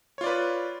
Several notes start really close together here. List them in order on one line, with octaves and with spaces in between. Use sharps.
C#5 F4 D5 B4